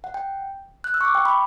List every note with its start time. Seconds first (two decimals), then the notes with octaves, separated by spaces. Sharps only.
0.04 F#5
0.14 G5
0.84 F#6
0.94 E6
1.01 C#6
1.05 D6
1.15 G5
1.25 B5